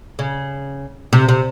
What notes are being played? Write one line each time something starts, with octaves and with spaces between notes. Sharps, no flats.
C#3
C3
C3